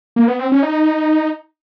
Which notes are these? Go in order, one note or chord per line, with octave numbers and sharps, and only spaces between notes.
A#3
B3
C4
C#4
D#4